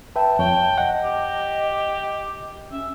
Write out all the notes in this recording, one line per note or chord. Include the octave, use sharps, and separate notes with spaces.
B4 E5 G5 A5
F2 C#5 G5
D#5 F#5
G4
C#4 E5